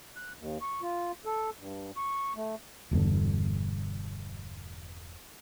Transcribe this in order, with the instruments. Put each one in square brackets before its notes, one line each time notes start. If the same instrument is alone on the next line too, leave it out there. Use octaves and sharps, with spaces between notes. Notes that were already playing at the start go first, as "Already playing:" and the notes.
[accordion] F#6
D#2
C#6
F4
A4
G2
C#6
A3
[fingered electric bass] E1 E2 G2 D3